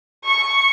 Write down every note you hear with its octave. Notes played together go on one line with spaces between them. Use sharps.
C#6